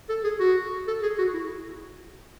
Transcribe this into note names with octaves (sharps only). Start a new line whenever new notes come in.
A4
G#4
F#4
A4
G#4
F#4
E4